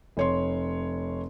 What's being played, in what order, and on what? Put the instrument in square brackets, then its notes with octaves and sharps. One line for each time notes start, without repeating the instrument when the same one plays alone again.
[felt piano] F1 C#5 C6